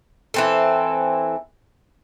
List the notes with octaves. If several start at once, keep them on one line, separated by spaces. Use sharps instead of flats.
E3 C4 A4